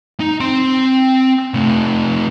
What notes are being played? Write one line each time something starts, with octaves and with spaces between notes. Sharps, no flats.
D#4
C4 C6
C3 A3